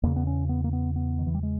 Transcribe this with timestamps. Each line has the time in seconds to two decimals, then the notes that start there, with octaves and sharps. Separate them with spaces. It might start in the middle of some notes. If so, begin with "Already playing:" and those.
0.03 E2 C#3 A#3
0.16 B3
0.27 C#4
0.49 B3
0.64 A#3
0.73 B3
0.96 B3
1.19 D#3
1.26 E3
1.34 G3
1.43 G#3